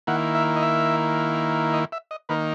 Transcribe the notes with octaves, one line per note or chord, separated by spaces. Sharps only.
D#3 A#3 E4 F#5
E5
D#5
E5
D#5
E5
D#5
D#3 A#3 D#4 B4